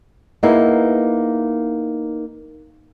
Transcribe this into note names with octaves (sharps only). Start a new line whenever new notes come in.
A#3 B3 D#4 E4 G#4